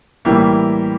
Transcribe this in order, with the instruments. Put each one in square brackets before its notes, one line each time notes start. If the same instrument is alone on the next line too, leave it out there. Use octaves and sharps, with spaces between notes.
[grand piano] A2 E3 G3 A#3 E4 G4